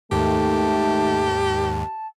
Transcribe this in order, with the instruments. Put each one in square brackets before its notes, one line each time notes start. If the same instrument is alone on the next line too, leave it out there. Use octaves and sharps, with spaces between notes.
[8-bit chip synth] D#2 G#2 [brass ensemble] D#3 A3 [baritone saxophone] G4 [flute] A5